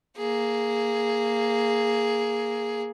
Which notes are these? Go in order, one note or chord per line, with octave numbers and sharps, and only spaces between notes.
A#3 G#4